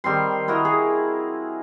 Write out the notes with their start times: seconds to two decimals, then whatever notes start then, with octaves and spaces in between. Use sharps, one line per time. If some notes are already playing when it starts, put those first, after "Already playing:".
0.04 D#3 G3 C4 C6
0.48 E4 F#4 A#4 D#5
0.65 G#4